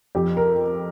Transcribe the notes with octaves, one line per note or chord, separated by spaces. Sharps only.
F2 G4
A#4